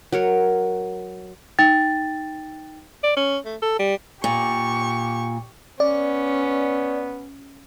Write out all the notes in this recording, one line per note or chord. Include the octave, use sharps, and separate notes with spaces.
F#3 A#4 C#5
D#4 G5 A6
D5
C#4
A3
A4
G3
A#2 G4 C#6
B3 C#4 D5